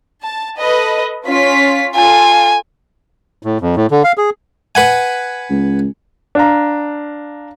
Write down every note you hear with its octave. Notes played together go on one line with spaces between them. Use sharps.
A5
A4 B4 D#5
C#4 F4 B6
F4 A4 G#5
A2
F2
A2
D3
F5
G#4
B4 F#5 G#5
C#2
D4 F5 A#5